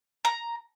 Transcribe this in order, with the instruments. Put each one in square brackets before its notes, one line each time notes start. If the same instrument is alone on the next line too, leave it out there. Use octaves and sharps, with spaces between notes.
[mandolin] A#5